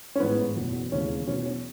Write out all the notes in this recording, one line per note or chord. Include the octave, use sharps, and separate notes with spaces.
C#4
A1 G#2 E3 B3
F#1 E2 B2 F#3
E1 D#2 C#3 E3 C#4
E2 B2 F#3 C#4
C#4